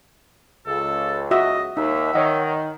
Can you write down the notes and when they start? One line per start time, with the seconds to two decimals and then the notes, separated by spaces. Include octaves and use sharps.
0.67 C#2 A4
1.31 F#4 D#5 E5
1.77 D#2 D#4 E5
2.14 D#3 C#5 D#5 F#5